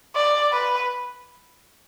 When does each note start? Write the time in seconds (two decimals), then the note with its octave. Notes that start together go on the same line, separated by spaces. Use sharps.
0.15 D5
0.53 B4